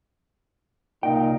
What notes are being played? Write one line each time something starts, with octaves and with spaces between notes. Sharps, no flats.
C2 A#2 D#4 D#5 G5